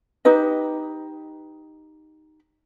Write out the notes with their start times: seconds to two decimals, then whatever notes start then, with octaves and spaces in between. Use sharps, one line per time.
0.25 D#4 G4 B4 D#5